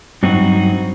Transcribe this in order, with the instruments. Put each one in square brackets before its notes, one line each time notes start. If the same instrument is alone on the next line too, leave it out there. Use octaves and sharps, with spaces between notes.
[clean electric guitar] G2 F#3 C4 D#4 F#4